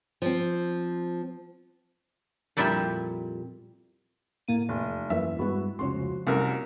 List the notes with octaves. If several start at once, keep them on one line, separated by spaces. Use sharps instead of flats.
F3 C4
F2 A#2 G3 E4 E5
A2 A#3 D#7
F1 E2
F#2 E3 A#3 E5
G2 G#3 B3 E4 F#4
F1 C#2 F3 C#4 F#4 C6
C2 F#2 C3 A3 A#4